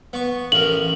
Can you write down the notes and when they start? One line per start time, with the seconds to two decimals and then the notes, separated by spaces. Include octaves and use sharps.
0.13 B3 C#6
0.52 A1 A#4 F#7